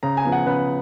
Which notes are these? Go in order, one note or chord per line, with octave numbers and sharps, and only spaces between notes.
C#3 A#5
G#5
F3 B3
F#5
C#3 B4